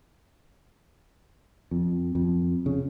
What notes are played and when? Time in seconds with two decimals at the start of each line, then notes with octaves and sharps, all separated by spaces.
1.71 F2
2.15 F2
2.66 C#3